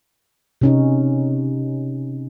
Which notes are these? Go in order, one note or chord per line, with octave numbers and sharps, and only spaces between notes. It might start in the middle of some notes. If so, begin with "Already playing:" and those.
C3 C#4 D#4